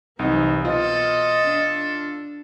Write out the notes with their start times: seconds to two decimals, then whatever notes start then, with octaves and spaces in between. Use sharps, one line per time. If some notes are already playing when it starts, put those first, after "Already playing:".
0.19 C2 E3 F#3 C4 D#4
0.65 B2 F4 A4 D#5
1.43 D4